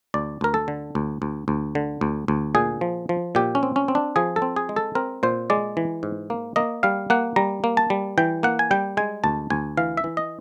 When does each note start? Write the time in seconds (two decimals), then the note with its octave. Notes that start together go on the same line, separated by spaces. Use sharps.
0.14 D2 D5
0.41 D2 A#4
0.54 A4
0.68 D3
0.95 D2
1.22 D2
1.48 D2
1.75 D3
2.01 D2
2.28 D2
2.55 A#2 G#4
2.81 F3
3.09 F3
3.35 A#2 G4
3.55 C#4
3.63 C4
3.76 C#4
3.88 C4
3.95 D4
4.16 F3 G#4
4.36 A4
4.42 C4
4.56 G#4
4.69 G#3
4.76 A4
4.95 C4 A#4
5.23 A#2 C5
5.50 G#3 D5
5.77 E3
6.03 G#2
6.30 A#3
6.56 A#3 D#5
6.83 G3 F5
7.10 A#3 F#5
7.36 G3 A#5
7.64 A#3
7.77 A5
7.90 G3
8.18 E3 G5
8.43 A#3 F#5
8.59 G#5
8.71 G3 G5
8.97 G#3 G#5
9.24 D2 A5
9.50 D2 G#5
9.77 E3 F5
9.97 E5
10.04 E3
10.17 D#5